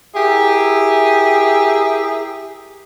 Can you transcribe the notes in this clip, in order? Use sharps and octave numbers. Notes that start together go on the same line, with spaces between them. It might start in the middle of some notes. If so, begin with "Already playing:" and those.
E4 G4 G#4 A#4 E5